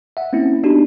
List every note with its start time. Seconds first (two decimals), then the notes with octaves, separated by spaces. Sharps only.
0.17 E5 F#5
0.33 A#3 C4 C#4 E4
0.64 B3 D4 D#4 F#4 G4